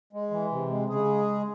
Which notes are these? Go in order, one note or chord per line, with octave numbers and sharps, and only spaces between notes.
G#3
E3
C3
G#3
C#3 G#3 G#4